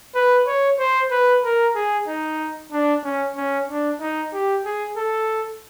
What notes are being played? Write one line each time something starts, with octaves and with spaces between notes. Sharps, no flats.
B4
C#5
C5
B4
A#4
G#4
D#4
D4
C#4
C#4
D4
D#4
G4
G#4
A4